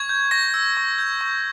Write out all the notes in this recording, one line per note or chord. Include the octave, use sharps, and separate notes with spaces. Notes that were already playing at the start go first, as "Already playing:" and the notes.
Already playing: C#6 G#6
G6
C#6 A#6
E6
C#6
G6
C#6